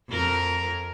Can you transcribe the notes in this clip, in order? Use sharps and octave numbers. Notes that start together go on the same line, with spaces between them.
F2 A#4